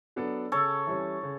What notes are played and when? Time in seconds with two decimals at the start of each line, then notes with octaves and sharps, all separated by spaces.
0.16 F#3 B3 D4 A4
0.52 C#3 A4 C#5
0.87 E3 G3 C#4
1.23 C#3